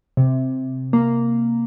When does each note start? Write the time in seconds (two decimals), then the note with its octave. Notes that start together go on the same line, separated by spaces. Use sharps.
0.17 C3
0.93 A#3